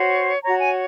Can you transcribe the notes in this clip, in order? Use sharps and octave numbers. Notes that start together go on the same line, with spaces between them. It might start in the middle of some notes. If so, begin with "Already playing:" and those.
Already playing: F#4 C5 C#5
F#4 C#5 A#5
G#5